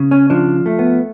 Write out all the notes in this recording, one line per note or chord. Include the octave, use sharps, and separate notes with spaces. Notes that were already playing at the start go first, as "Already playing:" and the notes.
Already playing: C#3
C#4
F3 D4
A3
B3